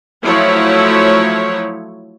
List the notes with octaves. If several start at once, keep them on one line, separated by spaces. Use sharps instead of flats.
F3 F#3 A3 E4 C#5